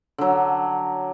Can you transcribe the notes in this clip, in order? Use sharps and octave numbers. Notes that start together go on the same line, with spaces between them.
D3 F#3